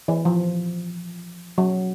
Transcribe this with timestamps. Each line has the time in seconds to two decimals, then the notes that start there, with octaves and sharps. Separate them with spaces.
0.08 E3
0.25 F3
1.58 F#3